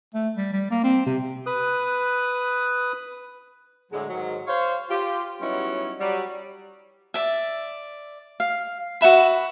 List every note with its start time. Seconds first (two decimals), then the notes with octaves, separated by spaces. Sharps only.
0.14 A3
0.37 G3
0.53 G3
0.71 A#3
0.84 C4
1.06 C3
1.46 B4 D#6 F#6
3.92 A2 D3 F#3 G#3
4.09 G#2 D#3 F#3
4.47 C5 C#5 F5
4.89 F4 G4
5.41 F#3 G3 B3 C#4 D#4 E4
6.00 F#3 G3
7.14 D5 E5
8.40 F5
9.01 F#4 B4 E5 B5